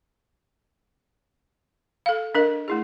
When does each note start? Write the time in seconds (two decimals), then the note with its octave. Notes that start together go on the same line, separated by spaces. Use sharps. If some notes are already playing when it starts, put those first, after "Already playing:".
2.06 A4 F5
2.35 D4 A#4 D#5
2.68 A3 E4 G#4